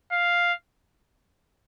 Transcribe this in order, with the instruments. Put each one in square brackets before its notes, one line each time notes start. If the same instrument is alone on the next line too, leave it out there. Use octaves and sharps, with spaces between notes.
[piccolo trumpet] F5